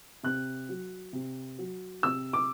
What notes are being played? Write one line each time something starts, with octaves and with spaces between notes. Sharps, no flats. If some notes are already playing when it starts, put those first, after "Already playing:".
C3 F#6
F#3
C3
F#3
C3 E6
D6